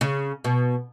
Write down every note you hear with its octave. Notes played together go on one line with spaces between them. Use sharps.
C#3
B2